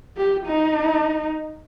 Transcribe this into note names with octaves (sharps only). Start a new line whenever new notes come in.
G4
D#4